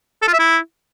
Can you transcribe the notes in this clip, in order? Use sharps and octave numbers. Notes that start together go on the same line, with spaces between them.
A4
F4
E5
E4